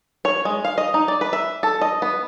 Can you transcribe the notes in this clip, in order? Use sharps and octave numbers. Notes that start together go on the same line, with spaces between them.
C#5
G#3
F5
D#5
D#4
D5
B4
E5
A4
D#5
B3